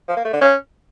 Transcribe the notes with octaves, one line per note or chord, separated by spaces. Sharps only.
F3
A#3
A3
D3
C#4